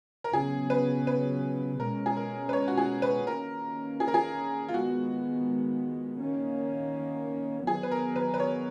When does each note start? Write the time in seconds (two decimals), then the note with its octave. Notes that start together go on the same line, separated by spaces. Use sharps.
0.24 A#4
0.33 C#3 F#3 B3 G#4
0.70 B4
1.07 B4
1.80 B2 G#3 C#4 A#4
2.06 G#4
2.17 A#4
2.49 B4
2.53 C#5
2.68 F#4
2.77 G#4
3.02 B4
3.27 D#3 A#3 C#4 A#4
4.00 G#4
4.08 A#4
4.14 G#4
4.69 F4
4.74 D#3 G#3 B3 F#4
6.20 D#3 A#3 C#4
7.66 D#3 F#3 B3 G#4
7.83 B4
7.91 A#4
8.16 B4
8.34 B4
8.40 C#5